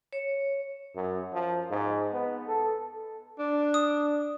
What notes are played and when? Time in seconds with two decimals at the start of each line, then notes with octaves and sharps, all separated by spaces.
0.13 C#5
0.95 F#2
1.33 F3
1.70 G#2
2.13 B3
2.47 A4
3.39 D4
3.74 D#6